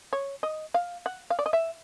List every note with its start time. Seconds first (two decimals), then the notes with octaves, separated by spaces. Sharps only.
0.13 C#5
0.43 D#5
0.74 F5
1.06 F#5
1.30 F5
1.39 D5
1.46 D#5
1.53 E5